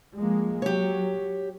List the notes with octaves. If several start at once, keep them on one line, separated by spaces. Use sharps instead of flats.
F3 G#3 A#3
F#3 G4 C#5